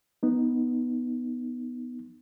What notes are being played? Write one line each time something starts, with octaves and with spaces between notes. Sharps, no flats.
B3 D#4